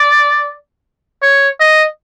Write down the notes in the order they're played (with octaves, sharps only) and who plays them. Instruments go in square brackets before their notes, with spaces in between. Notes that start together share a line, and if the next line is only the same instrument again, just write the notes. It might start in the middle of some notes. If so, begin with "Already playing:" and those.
Already playing: [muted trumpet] D5
C#5
D#5